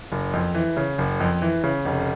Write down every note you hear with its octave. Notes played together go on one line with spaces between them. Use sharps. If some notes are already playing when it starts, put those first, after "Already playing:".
F#1
F2
E3
C#3
F#1
F2
E3
C#3
F1